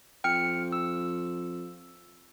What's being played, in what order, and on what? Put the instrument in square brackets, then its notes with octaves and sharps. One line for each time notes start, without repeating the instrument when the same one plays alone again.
[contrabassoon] F2 [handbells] G5 F6 C#7
[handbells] E6